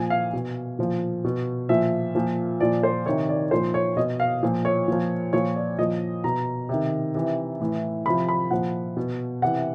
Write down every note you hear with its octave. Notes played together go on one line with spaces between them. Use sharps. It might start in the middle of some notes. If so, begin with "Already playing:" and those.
Already playing: A#2 F3 G#5
F5
B2
A#2 F3
B2
A#2 F3 E5
A#2 F3
A#2 F3 D5
C5
C3 D#3 C#5
D5
A#2 F3 C5
C#5
B2 D#5
F5
A#2 F3
C#5
A#2 F3
A#2 F3 C#5
D5
A#2 F3 D#5
B2 A#5
C3 D#3
C3 E3
A2 E3
C3 F3 B5
B5
A#2 F3 F#5
B2
C3 E3 F#5